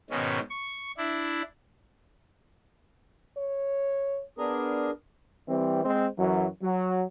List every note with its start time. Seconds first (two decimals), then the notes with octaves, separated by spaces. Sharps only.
0.10 G#2 B2 D#3 C#4
0.50 C#6
0.97 D4 E4
3.37 C#5
4.38 B3 D4 G#4 A#4
5.49 E3 G3 C4
5.84 G#3 C4 C5
6.19 F#2 E3 F#3
6.63 F#3